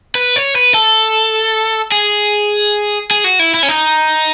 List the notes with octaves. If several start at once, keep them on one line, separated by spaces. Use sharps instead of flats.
B4
C#5
B4
A4
G#4
G#4
F#4
E4
E4
C#4
D#4